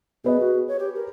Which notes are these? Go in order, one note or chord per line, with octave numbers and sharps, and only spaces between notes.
B3 G#4 B4 D#5
F#4
C#5
G4
A#4